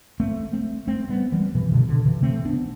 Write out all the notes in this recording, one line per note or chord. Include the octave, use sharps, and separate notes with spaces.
A3 C4
A3 C4
A3 C4
G3 B3
E3 G3
C3 E3
B2 D3
B2 D3
C3 E3
A3 C4
B3 D4